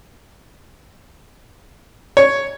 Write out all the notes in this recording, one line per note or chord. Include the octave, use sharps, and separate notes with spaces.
C#5